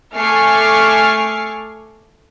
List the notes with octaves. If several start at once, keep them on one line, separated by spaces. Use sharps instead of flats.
A3 G#5 C#6 D6 F6 C7